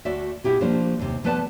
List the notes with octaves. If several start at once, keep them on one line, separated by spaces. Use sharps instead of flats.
D2 A3 F#4 D5 E5
B2 E4 G4 G#4
F3 A3 A#3 D4 F4 C5
D#2 C3
F3 A3 B3 B4 D5 A5